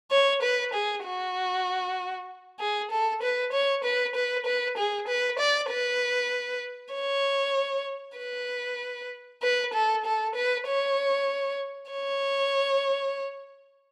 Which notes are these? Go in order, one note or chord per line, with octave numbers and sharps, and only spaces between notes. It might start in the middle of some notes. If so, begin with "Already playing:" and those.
C#5
B4
G#4
F#4
G#4
A4
B4
C#5
B4
B4
B4
G#4
B4
D5
B4
C#5
B4
B4
A4
A4
B4
C#5
C#5